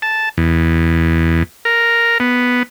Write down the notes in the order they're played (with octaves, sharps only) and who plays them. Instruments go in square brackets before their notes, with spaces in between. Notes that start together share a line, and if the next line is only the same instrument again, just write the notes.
[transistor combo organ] A5
E2
A#4
B3